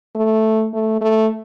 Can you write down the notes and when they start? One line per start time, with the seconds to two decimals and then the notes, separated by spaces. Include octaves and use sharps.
0.15 A3
0.74 A3
1.01 A3